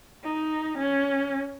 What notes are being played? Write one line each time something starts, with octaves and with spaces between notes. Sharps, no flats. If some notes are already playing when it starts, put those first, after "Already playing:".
D#4
C#4